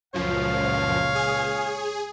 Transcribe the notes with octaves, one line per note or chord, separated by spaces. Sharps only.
C#2 F#2 A#2 F3 C#5 F5
G#4